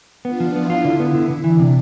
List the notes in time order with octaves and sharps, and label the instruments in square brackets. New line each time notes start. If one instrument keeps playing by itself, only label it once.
[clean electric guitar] B3 [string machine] D4 F4
[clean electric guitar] F3
[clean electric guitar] B3 [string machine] E4
[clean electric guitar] F4
D3
B3
D3
D3
[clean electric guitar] E3 [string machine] D4
[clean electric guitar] C3